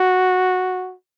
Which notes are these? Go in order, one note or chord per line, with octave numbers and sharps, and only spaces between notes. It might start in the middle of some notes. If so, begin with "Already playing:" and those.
Already playing: F#4